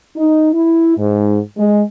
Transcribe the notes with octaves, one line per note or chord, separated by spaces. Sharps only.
D#4
E4
G#2
G#3